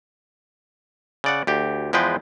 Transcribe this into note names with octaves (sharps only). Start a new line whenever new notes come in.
C#3 D5 F#5
D2 G4
E2 F3 G#3 B4 G5